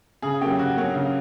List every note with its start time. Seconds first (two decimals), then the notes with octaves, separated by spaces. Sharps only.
0.22 C#3 G#4
0.41 F#3 A#3 C#4 G4
0.59 C#3 F#4
0.76 F#3 A#3 C#4
0.94 C#3